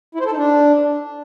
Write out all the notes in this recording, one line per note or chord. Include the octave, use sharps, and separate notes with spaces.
E4
C5
A4
D#4
D4